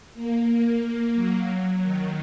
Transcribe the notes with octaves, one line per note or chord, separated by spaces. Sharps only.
A#3
F#3
D#3